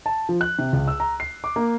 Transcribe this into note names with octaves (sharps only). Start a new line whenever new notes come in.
A5
F3
F#6
C3
C#2
E6
A#5
C7
D6
A#3